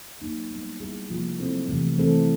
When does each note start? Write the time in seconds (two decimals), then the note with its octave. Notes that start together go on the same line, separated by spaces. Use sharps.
0.22 F#3 A#3 D#4
0.51 G3 B3 D#4
0.80 G3 B3 E4 G#4
1.10 C3 F3 A#3
1.39 F#3 A3 C4 E4 A4
1.68 C3 E3 A3
1.98 E3 A3 C4 E4 A4